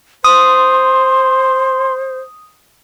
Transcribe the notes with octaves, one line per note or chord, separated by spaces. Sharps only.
C5 C6 D#6